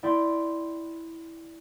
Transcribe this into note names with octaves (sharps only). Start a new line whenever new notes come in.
E4 D5 G5 C6